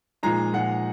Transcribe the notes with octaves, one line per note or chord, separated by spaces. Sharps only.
A#2 F3 G#3 D#4 A#5
A#2 F3 G#3 D#4 F#5